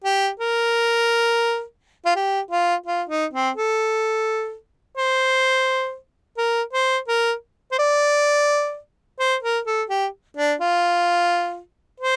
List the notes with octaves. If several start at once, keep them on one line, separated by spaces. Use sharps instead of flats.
G4
A#4
F4
G4
F4
F4
D#4
C4
A4
C5
A#4
C5
A#4
C5
D5
C5
A#4
A4
G4
D4
F4
C5